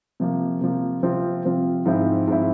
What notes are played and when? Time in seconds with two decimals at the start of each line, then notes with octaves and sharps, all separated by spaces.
0.20 C3 F3 A#3
0.61 C3 F3 A#3
1.03 C3 F3 C4 F4
1.45 C3 F3 C4 F4
1.85 G#2 F3 C4 E4
2.27 G#2 F3 C4 E4